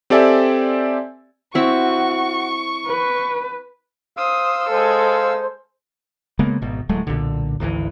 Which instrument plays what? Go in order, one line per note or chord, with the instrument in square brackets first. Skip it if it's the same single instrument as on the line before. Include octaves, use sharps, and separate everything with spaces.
[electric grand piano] C4 G4 A4 D5 E5 G#5
[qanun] C4 E4 [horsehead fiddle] F#4 [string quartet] C#6
[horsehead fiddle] B4
[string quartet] C5 D#6 [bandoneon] F5 E6
[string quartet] G#3 A4 [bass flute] C5
[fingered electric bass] C#3 G#3 A#3 B3
G#1 B2
D1 F#3 G#3 A3
B1 A#2 D3
G#1 D2 C3 E3